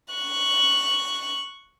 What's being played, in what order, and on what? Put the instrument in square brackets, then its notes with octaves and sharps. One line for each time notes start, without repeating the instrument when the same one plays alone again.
[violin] C#6 F#6